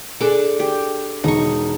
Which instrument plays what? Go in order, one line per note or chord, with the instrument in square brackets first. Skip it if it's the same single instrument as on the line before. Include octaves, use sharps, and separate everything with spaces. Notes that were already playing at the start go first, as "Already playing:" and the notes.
[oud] D4 G#4 A4 [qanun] D6
[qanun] G4
[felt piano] E1 [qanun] D#4 C#6